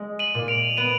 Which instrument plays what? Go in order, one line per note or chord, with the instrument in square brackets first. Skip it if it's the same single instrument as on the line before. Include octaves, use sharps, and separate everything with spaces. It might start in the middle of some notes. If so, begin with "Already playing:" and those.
Already playing: [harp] G#3
[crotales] D#7 F#7
[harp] A#2
[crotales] D7 F7
[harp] B3 [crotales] D#7 F#7